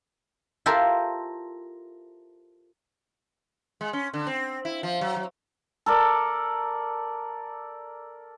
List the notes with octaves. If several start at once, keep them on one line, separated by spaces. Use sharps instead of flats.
E4 F4 G4 A4 A#4 C5
G#3
C#4
D3
C4
E4
F3
F#3
F#3
A4 A#4 D5